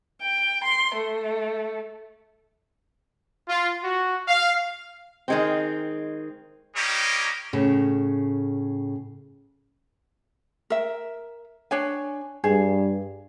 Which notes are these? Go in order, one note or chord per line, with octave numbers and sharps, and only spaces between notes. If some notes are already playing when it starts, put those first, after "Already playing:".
G5
C6
A3
F4
F#4
F5
D#3 G#3 C4
G3 A#3 D#4 G4 A#4 C#5
A2 C#3
A#4 E5
D4 C#5 G#5
G2 G#4